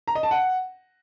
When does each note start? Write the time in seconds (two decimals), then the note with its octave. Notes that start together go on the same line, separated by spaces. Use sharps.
0.08 A#5
0.15 D#5
0.23 A5
0.31 F#5